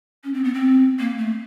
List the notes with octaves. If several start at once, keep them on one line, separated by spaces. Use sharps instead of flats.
C#4
C4
B3
C4
A#3
A3